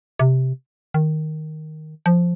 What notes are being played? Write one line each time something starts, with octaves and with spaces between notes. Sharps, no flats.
C3
D#3
F3